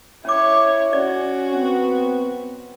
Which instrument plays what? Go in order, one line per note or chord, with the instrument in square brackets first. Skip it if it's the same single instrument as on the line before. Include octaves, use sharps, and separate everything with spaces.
[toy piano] C#4 D6 [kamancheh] E4 C#5
[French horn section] C#4 [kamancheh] F#4 [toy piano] D5
[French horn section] F#3 B3 C4